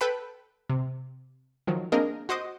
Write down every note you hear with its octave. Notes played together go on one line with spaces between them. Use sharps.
A4 B4 G5 A5 B5
C3
D#3 F3 F#3
A#3 C4 D4 G#4 A#4 D#5
F#4 C5 D#5 D6 D#6